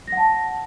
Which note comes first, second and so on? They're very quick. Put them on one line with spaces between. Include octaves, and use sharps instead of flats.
A#6 F#5 A5